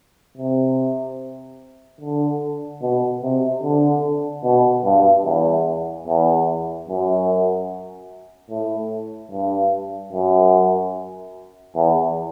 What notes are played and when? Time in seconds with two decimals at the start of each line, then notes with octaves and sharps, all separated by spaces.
0.37 C3
2.01 D3
2.82 B2
3.23 C3
3.63 D3
4.43 B2
4.84 G2
5.25 E2
6.07 E2
6.88 F#2
8.50 A2
9.31 G2
10.12 F#2
11.76 E2